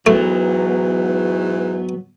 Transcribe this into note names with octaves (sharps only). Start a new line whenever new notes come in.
E2 G#2 E3 F#3 A3 B3